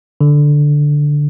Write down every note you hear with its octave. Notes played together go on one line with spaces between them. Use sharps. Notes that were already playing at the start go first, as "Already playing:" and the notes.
D3